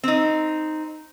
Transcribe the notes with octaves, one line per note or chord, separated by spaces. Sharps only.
C4 D#4